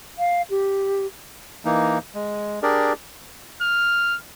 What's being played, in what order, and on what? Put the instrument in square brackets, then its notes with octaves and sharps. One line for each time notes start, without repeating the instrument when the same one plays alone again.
[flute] F5
G4
[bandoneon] E3 A#3 D#4
G#3
D4 G4 G#4 A#4 D5
[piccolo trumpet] F6